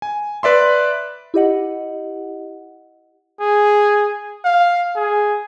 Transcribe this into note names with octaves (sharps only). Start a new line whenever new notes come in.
G#5
B4 D5 E5 C6
E4 G4 D#5 F#5
G#4
F5
G#4